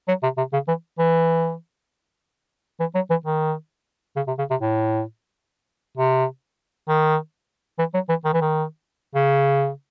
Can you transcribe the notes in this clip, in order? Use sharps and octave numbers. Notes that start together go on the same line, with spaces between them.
F#3
C3
C3
C#3
E3
E3
E3
F#3
E3
D#3
C#3
C3
C#3
C3
A2
C3
D#3
E3
F#3
E3
D#3
E3
D#3
C#3